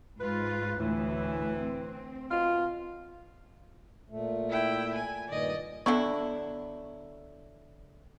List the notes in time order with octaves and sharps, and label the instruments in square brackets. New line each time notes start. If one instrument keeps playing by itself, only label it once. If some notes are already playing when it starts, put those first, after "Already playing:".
[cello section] G#2 F4 [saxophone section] B4
[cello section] D2 A2 [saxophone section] E3
[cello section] C4
[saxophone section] B2 F4
[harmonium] A#2 A3
[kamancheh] E4 G5
G#5
[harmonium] G2 A#2 D#3 [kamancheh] D5 D#5
[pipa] D3 F#3 E4 [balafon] B3 C#6